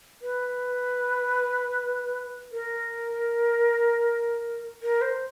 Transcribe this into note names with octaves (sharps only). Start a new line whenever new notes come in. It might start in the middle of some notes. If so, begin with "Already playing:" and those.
B4
A#4
A#4
C5